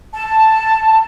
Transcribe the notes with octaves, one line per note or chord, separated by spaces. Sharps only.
A5